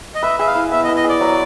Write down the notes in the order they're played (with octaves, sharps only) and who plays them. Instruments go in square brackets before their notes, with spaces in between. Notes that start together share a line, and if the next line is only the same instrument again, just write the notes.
[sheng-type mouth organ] D#5
[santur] B4 [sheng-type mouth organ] E5
[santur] G#4 [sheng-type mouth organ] E5
[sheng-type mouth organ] F5
[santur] E4
[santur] B3 [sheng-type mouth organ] E5
[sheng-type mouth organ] D#5
[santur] B4
[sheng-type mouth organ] D#5
[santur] G#4 [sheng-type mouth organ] D5
[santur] F#3